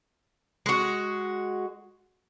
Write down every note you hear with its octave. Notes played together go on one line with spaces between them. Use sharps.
G#3 F#4